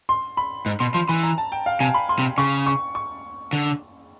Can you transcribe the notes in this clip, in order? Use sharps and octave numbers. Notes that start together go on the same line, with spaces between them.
C6
B5
G#2
B2 C6
F3 C6
E3 B5
A#5
A5
G5
F5
C3 G#5
B5
C6
C3
C#3 C#6
C#6
C#6
D3